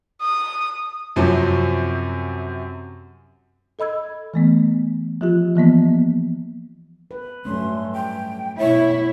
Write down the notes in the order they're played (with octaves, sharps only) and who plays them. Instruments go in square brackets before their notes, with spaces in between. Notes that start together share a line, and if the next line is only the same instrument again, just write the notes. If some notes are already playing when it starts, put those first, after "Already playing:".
[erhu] D#6
[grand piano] F#2 C3 F3 F#3 C4
[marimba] A4 D#5 B5 E6 G#6
E3 A3 B3
F3 F4 G4
E3 F3 A#3 B3
[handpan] B4
[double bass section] G2 [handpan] F#3 A3 C#4 [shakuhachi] C6
[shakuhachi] G5
[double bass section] B2 [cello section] E4 [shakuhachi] C#5